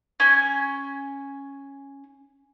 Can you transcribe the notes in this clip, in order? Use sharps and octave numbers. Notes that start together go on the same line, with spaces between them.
C#4 G#5